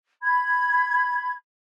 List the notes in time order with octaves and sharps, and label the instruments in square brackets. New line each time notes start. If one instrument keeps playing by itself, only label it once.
[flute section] B5 G#6